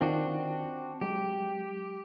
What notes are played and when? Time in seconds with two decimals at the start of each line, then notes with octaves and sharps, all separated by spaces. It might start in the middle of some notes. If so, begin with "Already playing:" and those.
0.01 D#3 C4 D4 F4 F#4
1.01 F#3 G#3 G4